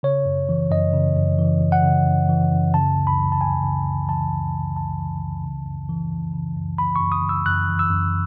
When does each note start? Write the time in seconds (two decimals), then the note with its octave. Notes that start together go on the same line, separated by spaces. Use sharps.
0.03 C#3 C#5
0.25 F#2
0.49 E3
0.71 F#2 D#5
0.93 C#3
1.16 F#2
1.39 E3
1.61 F#2
1.72 F#5
1.83 C#3
2.06 F#2
2.29 E3
2.51 F#2
2.74 C#3 A5
2.96 C#2
3.07 B5
3.18 E3
3.32 A5
3.41 C#2 G#5
3.64 C#3
3.85 C#2
4.08 E3 A5
4.31 C#2
4.54 C#3
4.76 C#2 A5
4.99 E3
5.21 C#2
5.43 C#3
5.66 F#2
5.89 E3
6.11 F#2
6.34 C#3
6.56 F#2
6.78 E3 B5
6.96 C#6
7.01 F#2
7.12 D#6
7.23 C#3
7.29 E6
7.46 F#2 F#6
7.69 E3
7.79 E6
7.91 F#2